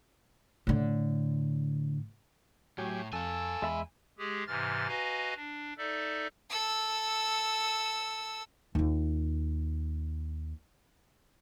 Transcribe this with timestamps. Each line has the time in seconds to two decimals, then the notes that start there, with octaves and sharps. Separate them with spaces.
0.67 A2 D3
2.78 A2 F#3 G4 G#5
3.13 F2 A4 F5 G#5 E6
3.62 E2 G#3 E5 B5
4.18 G#3 G4 G#4
4.47 G#2 C3 E3 F6 A6
4.88 F#4 B4 D#5 F5 G#5 A#5
5.36 D4
5.78 D#4 A4 D5 E5
6.50 A4 E6
8.75 D#2 F4